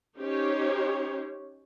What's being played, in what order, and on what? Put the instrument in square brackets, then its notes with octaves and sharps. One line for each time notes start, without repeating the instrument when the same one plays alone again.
[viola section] C#4 D#4 G4 C5 C#5